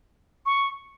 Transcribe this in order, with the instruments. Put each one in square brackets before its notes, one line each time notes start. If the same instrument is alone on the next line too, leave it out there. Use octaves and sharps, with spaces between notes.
[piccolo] C#6